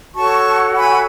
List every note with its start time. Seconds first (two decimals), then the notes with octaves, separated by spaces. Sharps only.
0.15 F#4 A4 C#5 A5 C#6
0.76 G#5 B5